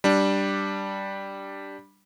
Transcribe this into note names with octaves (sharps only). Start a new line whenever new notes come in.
G3 D4